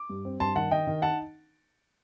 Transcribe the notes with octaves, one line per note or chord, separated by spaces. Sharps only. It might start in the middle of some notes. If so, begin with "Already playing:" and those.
Already playing: D6
G2
C4
G2 A5 C6
D#3 F#5 A5
D#3 D#5 G5
D#3
D#4 F#5 A5